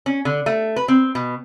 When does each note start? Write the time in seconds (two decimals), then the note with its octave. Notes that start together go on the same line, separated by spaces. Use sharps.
0.06 C#4
0.25 D3
0.46 A3
0.76 B4
0.88 C4
1.15 B2